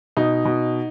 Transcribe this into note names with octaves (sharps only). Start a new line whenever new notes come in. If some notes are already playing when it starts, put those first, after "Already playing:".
B2 D#4
B2